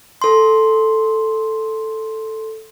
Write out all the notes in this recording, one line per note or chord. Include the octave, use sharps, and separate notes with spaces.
A4 C6